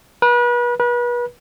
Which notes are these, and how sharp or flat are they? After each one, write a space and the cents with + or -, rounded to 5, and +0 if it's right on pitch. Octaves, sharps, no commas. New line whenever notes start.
B4 -35
B4 -35